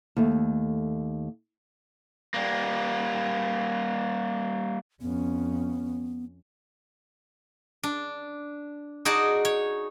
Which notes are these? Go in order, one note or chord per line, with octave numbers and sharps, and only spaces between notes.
D#2 A3
G3 A#3
F2 B3 C#4
D4
D#4 F#4 G#4 D5 A5
C#5